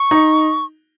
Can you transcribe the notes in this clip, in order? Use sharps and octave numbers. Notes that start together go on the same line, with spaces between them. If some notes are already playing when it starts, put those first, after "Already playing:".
Already playing: C#6
D#4